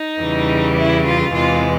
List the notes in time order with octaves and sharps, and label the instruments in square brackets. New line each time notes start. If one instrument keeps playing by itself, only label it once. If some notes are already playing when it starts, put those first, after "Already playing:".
Already playing: [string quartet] D#4
E2 C#3 E3 G3
E4
F4
E2 C3 E3 G#3 F4